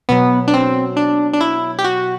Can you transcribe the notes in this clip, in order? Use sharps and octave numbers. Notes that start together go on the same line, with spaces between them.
B2 F#3 B3
D4
C4
D4
D4
E4
G4
F#4